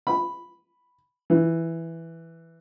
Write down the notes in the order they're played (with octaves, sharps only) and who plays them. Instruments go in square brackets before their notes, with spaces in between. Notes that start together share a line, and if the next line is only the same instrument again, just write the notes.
[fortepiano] B5
E3